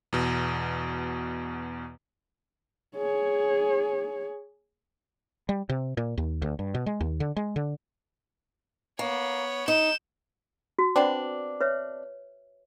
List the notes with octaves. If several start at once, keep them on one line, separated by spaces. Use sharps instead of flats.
E2 B2
G#4 C#5
G3
C3
A#2
D#2
D2
G2
B2
G#3
D#2
D3
G#3
D3
A#3 B3 C#5
D#4 G6 E7
F#4
B3 C4 D4
B4 C#5 E5